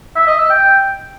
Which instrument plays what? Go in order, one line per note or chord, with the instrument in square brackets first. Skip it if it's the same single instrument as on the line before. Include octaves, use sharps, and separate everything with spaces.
[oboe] E5
D#5
E6
G5